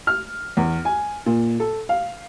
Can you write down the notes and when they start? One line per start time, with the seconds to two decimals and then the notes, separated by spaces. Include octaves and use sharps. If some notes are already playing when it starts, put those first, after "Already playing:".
0.07 F6
0.57 E2
0.85 G#5
1.26 A#2
1.60 A4
1.89 F5